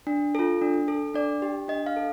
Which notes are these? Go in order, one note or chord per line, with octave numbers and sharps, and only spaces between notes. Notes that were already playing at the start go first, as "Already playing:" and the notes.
D4
F4 A4
D4
A4
D4 D5
G4
D4 D#5
F5
A4